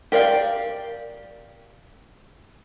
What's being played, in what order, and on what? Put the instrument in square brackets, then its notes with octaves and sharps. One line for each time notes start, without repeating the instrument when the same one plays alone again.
[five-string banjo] G4 A#4 D5 F5 G5